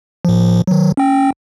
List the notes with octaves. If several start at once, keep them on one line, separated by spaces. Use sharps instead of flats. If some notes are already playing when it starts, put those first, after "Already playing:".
A2 F3
D#3 F#3
C#4 G5